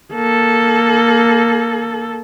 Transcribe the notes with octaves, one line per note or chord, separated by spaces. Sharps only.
A#3 A4